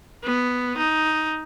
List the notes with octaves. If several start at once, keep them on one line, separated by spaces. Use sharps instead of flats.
B3
D#4